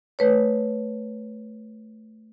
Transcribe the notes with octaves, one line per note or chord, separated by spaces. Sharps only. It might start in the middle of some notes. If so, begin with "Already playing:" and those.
A3 B4 C#5